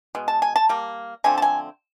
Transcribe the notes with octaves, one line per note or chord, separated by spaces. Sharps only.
B2 G#3
A5
G#5
A5
G3 A#3
D3 F3 A3 C4 G#5
A5
G#5